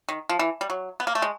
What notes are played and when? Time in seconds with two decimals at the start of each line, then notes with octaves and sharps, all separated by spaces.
0.09 D#3
0.29 F3
0.39 E3
0.61 G3
0.70 F#3
1.00 B3
1.07 A#3
1.15 A3
1.22 G#3